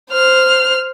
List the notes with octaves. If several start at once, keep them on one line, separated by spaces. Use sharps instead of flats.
C5 F6